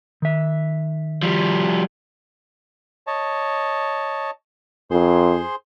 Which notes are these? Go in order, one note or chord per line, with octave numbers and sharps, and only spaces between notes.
D#3 E5
F3 G3
C#5 D#5 A5
F2 G#4 C5 C6